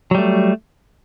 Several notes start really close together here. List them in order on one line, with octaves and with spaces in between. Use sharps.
F#3 G3 A3